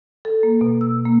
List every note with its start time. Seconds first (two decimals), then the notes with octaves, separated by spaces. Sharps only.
0.25 A4
0.43 A#3
0.61 B2
0.81 E6
1.05 A#3